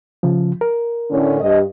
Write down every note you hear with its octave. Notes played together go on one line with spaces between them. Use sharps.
C#3 F3
A#4
A2 D3 C#4
G2 D#5